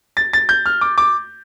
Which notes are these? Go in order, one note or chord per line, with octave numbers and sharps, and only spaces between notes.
A6
A6
G6
F6
D6
D6